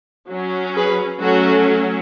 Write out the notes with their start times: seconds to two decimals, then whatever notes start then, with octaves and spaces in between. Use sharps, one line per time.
0.30 F#3 C#4
0.76 G#4 B4
1.21 F#3 A3 C#4 F#4 A4